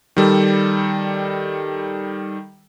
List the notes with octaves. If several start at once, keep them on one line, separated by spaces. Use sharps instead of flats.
D#3 G3 A4